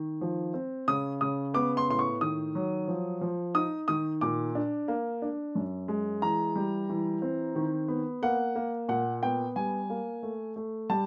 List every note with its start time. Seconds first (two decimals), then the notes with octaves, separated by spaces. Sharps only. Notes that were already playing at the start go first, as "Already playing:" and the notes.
Already playing: D#3
0.21 F3
0.54 C4
0.88 C#3 D#6
1.21 C#3 D#6
1.54 B3 D6
1.77 C6
1.89 A2 C6
1.99 C#6
2.21 D#3 D#6
2.55 F#3
2.88 F3
3.21 F3
3.55 D#4 D#6
3.88 D#3 D#6
4.21 A#2 D6
4.55 D4
4.88 A#3
5.22 D4
5.55 F#2
5.88 G#3
6.22 E3 A#5
6.56 G3
6.89 E3
7.22 C4
7.56 D#3
7.88 B3
8.22 A#3 F#5
8.55 A#3
8.88 A#2 F#5
9.23 B3 G5
9.56 G3 G#5
9.90 A#3
10.23 A3
10.56 A3
10.89 G3 A5